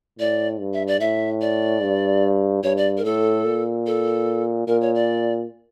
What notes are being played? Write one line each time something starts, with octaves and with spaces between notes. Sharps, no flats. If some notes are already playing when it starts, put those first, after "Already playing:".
A2 D5
G2
E5
D5
A2 E5
D5
G2
G2 C#5
D5
A#4
A2 A4
A#2
A4
A#2 A#4
C#5
D5